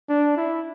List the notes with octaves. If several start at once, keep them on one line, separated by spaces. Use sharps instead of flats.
D4
E4